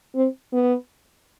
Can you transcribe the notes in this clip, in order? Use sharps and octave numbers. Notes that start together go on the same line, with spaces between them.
C4
B3